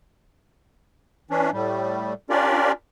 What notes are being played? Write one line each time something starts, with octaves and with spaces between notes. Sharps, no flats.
E3 C#4 D4
A2 G3
C#4 D4 F4 G4 A#4 D5